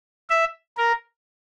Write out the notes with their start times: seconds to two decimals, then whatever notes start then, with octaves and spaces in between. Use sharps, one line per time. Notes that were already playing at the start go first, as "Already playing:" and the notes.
0.30 E5
0.78 A#4